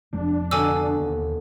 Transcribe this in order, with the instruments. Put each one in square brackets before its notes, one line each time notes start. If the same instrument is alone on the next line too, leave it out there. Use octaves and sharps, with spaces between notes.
[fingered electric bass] F1 F2 G#3 [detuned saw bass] D4
[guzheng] B2 D3 [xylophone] G#5 D6 E6
[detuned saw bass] D#2